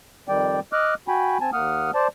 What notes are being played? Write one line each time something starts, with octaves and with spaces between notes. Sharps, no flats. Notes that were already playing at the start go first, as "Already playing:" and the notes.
F2 D#3 G3 D5 G5
D#5 D6 F6 F#6
F#4 G5 G#5 B5
C4 G#5 A5
D#2 A#3 F#5 D#6 F6
C5 D5 A5